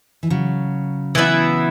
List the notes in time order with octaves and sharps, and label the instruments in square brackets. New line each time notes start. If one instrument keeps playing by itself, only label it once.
[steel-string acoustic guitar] E3
C#3 F#3
[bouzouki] E3 B3 E4